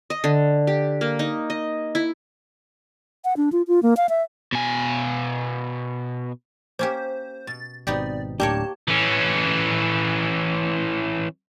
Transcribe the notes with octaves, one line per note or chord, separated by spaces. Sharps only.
D#5
D3
G4
A#3
D#4
D#5
E4
F#5
D4
F4
F4
A#3
F5
E5
B2 G#5
A#3 C#4 G4 C5
B2 A6
G#1 B2 B3 C4 D#4 G4 D5
D1 A2 A#3 D4 G4 A#4 C#5 A5
E3 C#4